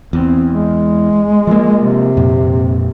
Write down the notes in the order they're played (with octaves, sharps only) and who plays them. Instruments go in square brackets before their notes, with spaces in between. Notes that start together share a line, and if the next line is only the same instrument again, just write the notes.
[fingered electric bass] E2 [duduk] C4
[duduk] G#3
[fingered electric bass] F3 A#3
[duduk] C3
[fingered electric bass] F2 A#2